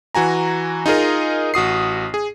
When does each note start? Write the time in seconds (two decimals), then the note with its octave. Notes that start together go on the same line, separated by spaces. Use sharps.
0.15 E3 F#4 G#5 A#5
0.86 D#4 F4 G#4 A#4 D#5
1.54 A1 F#4 D#6 C7
2.14 G#4